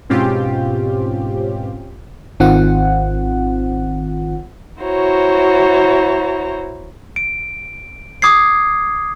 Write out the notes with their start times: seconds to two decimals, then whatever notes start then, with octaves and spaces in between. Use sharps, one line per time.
0.10 G#2 B2 C4 C#4 F4 G4
2.40 G#1 D#3 C4 F4 F#5
4.80 E4 F#4 C5 C#5 A#5
7.16 D7
8.22 D6 D#6 G#6 C7